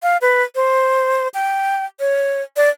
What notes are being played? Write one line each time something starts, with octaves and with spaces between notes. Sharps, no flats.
F5
B4
C5
G5
C#5
D5